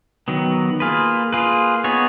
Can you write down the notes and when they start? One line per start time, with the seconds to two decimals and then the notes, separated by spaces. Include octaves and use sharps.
0.28 D#3 F#3 B3
0.80 A#3 F4 G#4 B4
1.33 A#3 F4 G#4 B4
1.84 B3 D#4 G#4 C#5